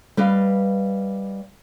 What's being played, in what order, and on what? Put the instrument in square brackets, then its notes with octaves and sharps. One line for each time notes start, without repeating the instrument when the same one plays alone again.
[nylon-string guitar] G3 B4 D#5 F5